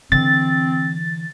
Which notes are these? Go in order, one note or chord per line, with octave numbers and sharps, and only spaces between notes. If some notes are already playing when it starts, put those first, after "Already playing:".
D3 E3 C4 A6